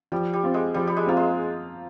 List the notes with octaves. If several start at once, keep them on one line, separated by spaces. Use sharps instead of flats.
F3 G3
G3
C4 F4
G#3
F3 G3
G3
G#3
A#3 C4 F4
G#3